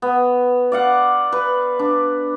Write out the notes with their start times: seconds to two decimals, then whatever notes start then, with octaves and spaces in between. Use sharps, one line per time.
0.02 B3
0.72 D5 F5 F#5
1.32 B4
1.79 D4